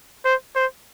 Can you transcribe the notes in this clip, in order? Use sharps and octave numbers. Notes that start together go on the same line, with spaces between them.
C5
C5